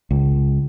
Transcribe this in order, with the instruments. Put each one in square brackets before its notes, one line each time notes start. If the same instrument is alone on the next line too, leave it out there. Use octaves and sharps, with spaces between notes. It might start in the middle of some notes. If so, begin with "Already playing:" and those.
[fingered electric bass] C#2